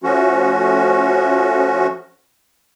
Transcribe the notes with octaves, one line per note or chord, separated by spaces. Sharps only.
F3 A3 C#4 F#4